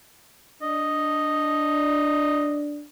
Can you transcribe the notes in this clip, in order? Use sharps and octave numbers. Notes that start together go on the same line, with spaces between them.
D4 D#5